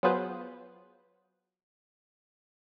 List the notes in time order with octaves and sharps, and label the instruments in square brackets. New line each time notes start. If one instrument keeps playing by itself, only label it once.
[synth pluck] F#3 B3 F4 G#4 B4 C5